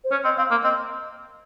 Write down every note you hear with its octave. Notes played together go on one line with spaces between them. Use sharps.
C5
C#4 C#5
C4 D#5
C4 F5
A#3 F5
C4 D#5